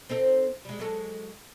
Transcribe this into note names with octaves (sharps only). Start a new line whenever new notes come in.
C4 D#4 A4
G3 G#3
F#3 G#3 A4